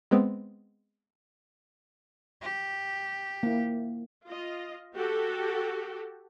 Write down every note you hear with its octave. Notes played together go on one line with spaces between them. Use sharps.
G#3 B3 C4
G4
A#3 E4
F4 D#5
F#4 G4 A4